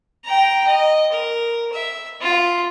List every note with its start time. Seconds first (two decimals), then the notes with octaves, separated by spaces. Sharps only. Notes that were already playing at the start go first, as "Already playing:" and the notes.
0.24 G5 A#5
0.67 D#5
1.12 A#4
1.73 E5
2.21 F4